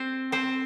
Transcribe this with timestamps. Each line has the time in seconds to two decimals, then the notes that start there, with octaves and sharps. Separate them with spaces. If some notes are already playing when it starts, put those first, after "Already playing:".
Already playing: C4 C5
0.32 C4 C5